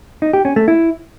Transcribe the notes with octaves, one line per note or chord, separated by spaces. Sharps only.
D#4
G4
C#4
A3
E4